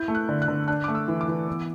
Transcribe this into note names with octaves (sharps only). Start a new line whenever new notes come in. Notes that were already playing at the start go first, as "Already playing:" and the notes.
Already playing: E4 G6
A3
F#6
D3
F#6
D3
D4 F#6
A3 D6
E6
E3
D6
E3
B3